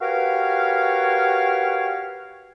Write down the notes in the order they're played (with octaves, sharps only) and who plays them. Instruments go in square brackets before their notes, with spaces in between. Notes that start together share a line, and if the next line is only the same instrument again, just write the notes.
[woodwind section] F#4 G4 A#4 B4 C#5 F5